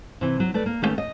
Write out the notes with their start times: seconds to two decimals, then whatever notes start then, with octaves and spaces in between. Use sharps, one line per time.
0.21 C3 E3
0.40 F#3
0.54 A3 B4 D5
0.66 A#3
0.82 D#3 G3 A3 B3 C#4 G4
0.98 D#5